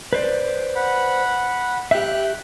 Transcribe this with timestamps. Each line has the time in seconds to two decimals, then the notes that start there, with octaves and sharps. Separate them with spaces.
0.13 B4 C5 D5
0.75 F#5 B5
1.91 G4 E5 G5 F#6